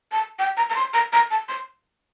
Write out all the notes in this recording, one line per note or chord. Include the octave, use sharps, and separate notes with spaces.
A5
G5
A#5
A#5
C6
A#5
A#5
A5
C6